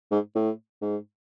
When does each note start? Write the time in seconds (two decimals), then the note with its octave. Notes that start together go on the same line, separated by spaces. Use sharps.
0.11 G#2
0.35 A2
0.82 G#2